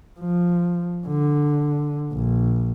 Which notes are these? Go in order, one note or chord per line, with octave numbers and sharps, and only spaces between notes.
F3
D3
A#1